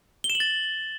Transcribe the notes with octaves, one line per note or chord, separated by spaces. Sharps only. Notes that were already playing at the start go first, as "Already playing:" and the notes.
G7
E7
F#7
A6